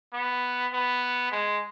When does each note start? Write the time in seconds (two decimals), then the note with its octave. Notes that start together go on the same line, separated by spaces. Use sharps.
0.13 B3
0.73 B3
1.32 G#3